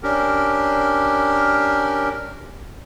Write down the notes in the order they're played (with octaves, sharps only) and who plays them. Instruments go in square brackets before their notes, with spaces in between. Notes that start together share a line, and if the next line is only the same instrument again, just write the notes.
[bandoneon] C#4 D4 G4 A#4